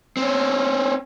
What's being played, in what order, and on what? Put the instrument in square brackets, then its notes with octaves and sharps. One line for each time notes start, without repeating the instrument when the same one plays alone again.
[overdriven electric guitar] C4 C#4